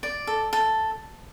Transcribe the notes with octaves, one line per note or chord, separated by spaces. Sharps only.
D5
A4
A4